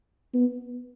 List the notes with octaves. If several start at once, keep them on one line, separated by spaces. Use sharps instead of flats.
B3